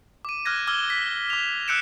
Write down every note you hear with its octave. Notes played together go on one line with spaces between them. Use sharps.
D6 D#7
D6 F6 F#6 G#6 A#6
D6 E6 F6 G#6 G7
B6
D6 F7
E6 F#6 G6 C#7 D7 E7